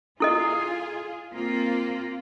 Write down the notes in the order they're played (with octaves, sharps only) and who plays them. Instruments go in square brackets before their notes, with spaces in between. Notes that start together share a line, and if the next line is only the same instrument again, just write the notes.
[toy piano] E4 A4 D#5 [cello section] F4 G#4
[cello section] A#3 C4 F4